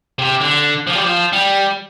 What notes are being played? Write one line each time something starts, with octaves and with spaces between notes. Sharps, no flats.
C3
D3
F3
G3
F3
G3